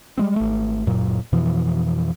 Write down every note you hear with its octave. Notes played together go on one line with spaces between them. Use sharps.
G3 G#3 C4
G#1 A3
D1 F#2 A#2 F#3
F2 B2 E3 F3